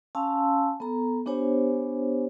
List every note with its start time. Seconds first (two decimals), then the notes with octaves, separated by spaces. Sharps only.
0.15 C#4 F5 G#5 A5 C6 E6
0.80 B3 A4 A#5
1.26 B3 D4 G4 C5 C#5 G#5